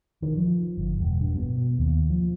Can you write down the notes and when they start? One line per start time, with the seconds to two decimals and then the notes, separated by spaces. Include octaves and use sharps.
0.22 D#3
0.37 F3
0.77 G1
1.00 E1
1.20 G2
1.37 B2
1.79 D#2
2.10 F3